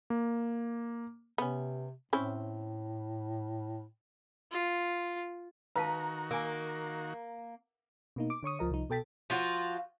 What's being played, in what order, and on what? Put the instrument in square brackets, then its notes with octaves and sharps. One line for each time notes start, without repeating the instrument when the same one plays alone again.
[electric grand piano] A#3
[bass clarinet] C3 [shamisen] B3 C#4
[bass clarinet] A2 [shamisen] C4 C#4 E4
[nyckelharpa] F4
[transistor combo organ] D#3 F#4 [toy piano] B4 F5 A5 [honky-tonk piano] A#5
[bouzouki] A#3 [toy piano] A#4 G#5
[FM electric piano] B2 A#3 D#4
D6
D3 C#5 C#6 D#6
C#2 F3 A#4 D#5
C2 F3 D#4
B2 A4 G5 A6 B6
[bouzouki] F3 F4 F#4